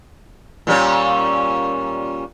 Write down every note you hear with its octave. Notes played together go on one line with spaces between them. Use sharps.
A#2 G3 C#4